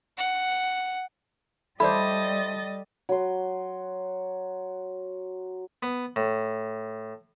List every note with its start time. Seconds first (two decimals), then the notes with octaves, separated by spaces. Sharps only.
0.18 F#5
1.80 G3 E4 A4 C5 D5 D#5 B5 A6
3.09 F#3 C6
5.83 B3
6.16 A2